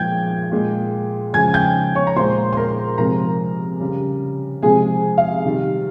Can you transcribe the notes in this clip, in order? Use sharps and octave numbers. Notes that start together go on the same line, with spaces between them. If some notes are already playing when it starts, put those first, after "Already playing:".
Already playing: A#2 F3 G#3 G5 G6 G#6
A#2 G#3
C#3 F3 G#3 G#5 G#6
G5 G6
C#5 C#6
A#5
A#2 G#3 C5 C6
C6
A#4 A#5
C3 F3 G#3 A#4 A#5
C#3 G3
C3 F3 G#3 G#4 G#5
F5
C3 D#3 G3